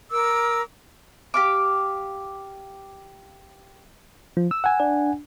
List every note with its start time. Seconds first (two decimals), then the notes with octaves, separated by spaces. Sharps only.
0.11 A#4 D6 E6
1.34 G4 F5 D6
4.37 F3
4.51 E6
4.64 F#5 G#5
4.80 D4